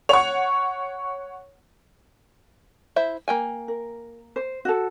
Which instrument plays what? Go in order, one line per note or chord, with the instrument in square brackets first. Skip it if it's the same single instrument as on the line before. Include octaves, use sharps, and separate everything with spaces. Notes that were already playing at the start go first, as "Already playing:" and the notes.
[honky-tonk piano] C#5 F#5 [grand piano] C#6 F7
[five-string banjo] E4 C5 E5
A#3 G5 G#5
[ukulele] A#4
C5
F#4 A4